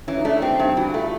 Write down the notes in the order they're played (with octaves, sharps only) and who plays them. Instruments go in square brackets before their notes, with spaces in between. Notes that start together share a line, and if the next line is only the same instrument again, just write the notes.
[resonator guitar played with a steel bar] E3 [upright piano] C#4
[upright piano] D#4
[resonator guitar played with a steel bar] A3 [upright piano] D4
[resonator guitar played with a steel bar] C4 [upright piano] G4
[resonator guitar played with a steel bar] G2
[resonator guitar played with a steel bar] E3 [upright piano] F#4
[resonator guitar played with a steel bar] A3 [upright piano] F4